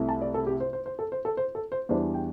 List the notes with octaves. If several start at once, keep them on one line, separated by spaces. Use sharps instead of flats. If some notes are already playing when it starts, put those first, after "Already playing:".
Already playing: C2 C3 A3 E4
A5
D5
A4
G4
C5
C5
C5
A4
C5
A4
C5
A4
C5
E2 E3 G3 D4 C5
G5